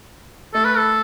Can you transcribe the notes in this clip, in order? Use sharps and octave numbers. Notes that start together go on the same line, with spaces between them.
A3 A4
B4
A4